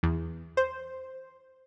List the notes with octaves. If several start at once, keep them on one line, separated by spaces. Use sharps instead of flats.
E2
C5